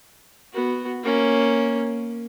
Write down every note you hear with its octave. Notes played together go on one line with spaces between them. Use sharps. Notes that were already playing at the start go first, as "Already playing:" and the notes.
B3 F#4
A#3 C#4